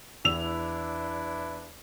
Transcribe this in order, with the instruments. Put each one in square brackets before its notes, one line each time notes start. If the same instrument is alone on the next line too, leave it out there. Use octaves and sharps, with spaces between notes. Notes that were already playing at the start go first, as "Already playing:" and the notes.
[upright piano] E2 E6 F7 [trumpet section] D4 E4 B4